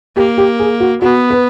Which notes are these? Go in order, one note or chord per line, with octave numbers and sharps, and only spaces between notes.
A#3 G4
G4
G#4
F#4
B3 F#4
B4